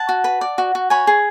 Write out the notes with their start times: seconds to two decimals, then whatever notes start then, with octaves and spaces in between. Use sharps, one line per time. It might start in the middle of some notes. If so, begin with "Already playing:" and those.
Already playing: F#5 A5
0.09 F#4
0.24 B4
0.41 D5
0.58 F#4
0.75 F#4
0.90 C#5 G#5 B5
1.07 G#4